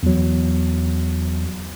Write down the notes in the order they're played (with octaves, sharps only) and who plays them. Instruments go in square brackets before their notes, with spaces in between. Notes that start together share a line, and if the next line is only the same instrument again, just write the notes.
[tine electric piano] E2 F#3